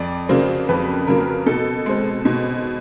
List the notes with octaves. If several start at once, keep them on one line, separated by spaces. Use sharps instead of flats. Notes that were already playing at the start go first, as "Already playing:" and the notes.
Already playing: F2 D5
C#3 F#3 A#3 C5
F2 B4
C#3 F#3 A#3 A#4
B2 A4
G#3 C4
B2